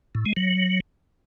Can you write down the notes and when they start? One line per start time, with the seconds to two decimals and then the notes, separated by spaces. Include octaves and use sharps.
0.15 A2
0.26 G#3
0.37 F#3